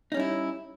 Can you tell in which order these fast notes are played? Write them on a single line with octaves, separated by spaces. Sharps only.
D#4 C#4 G3 E4